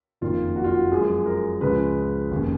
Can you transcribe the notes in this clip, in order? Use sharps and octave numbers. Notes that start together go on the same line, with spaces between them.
F#1 F2 D#3 A#3 F4
F#4
F4
F#4
F#2 F3 G#3 G#4
A#4
C#2 C#3 F3 G#3 B4
F1 D#2 C#3